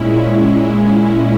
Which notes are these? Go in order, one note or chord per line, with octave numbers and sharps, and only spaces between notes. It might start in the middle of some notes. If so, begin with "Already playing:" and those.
Already playing: A#2 G#3 C#4 E4